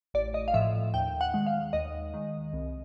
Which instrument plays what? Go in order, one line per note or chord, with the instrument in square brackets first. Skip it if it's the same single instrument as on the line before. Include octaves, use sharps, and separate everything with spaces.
[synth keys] A1 D5
D#5
F5
A2 F3 E5
D#2 G5
F#5
D#3 G#3
F5
D#2 D#5
D#3 G#3
C2